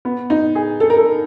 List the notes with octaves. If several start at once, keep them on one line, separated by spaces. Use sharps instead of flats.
B3
D#4
G#4
A4
A#4
A4